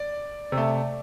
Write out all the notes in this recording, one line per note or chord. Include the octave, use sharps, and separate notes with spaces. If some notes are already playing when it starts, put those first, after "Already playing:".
Already playing: D5
C3
A3